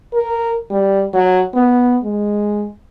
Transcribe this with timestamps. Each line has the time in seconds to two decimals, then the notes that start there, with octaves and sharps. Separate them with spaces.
0.13 A#4
0.71 G3
1.14 F#3
1.54 B3
2.03 G#3